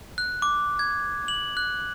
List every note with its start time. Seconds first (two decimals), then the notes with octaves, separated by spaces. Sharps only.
0.18 F#6
0.42 D6
0.79 G#6
1.28 F#7
1.57 F#6